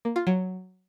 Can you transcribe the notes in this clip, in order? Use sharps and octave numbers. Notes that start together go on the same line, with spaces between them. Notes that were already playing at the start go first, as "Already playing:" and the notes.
A#3
F4
F#3